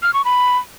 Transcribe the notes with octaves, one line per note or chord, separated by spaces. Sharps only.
F6
C#6
B5